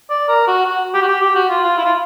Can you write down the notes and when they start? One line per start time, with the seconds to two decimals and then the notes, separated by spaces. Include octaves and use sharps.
0.10 D5
0.28 A#4
0.47 F#4
0.65 F#4
0.94 G4
1.02 F#4
1.08 G4
1.22 G4
1.35 F#4
1.49 F4
1.64 F4
1.77 E4
1.85 F4